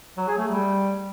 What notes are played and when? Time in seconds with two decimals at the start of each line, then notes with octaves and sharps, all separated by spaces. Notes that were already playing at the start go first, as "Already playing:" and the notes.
0.17 F#3
0.28 G#4
0.38 A3
0.48 G3